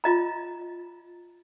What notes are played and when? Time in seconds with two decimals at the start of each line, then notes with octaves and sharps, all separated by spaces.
0.04 F4 D#5 A#5